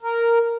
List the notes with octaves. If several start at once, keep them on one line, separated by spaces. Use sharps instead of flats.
A#4